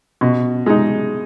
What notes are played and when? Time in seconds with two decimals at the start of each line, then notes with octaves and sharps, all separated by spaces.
0.21 B2
0.66 G#3 D#4